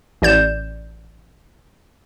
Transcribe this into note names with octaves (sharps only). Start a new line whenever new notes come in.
A1 D5 G6 E7